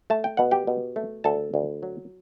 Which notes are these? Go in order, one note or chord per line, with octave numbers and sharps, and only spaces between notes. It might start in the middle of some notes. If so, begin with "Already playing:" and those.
A3 A5
G5
B2 F#5
G4 G5
B2
A3
D2 A4 A5
D2
F#3